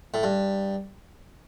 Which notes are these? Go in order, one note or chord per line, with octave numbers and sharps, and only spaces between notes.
A2
G2